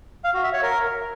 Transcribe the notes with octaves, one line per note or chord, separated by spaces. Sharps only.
F5
F#4
E5
C#5
A#4